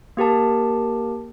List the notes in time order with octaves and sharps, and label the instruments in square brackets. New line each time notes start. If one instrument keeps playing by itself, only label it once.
[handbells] A#3 G4 A#4 A5